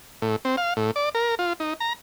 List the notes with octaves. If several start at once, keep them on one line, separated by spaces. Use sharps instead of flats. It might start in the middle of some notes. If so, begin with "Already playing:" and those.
A2
C4
F5
A2
D5
A#4
F4
D#4
A#5